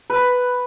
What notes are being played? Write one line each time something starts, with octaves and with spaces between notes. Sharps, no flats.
B4